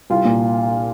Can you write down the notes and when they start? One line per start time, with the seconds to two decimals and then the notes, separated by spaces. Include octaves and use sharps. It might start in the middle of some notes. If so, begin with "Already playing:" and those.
0.10 C2 F4
0.25 A#2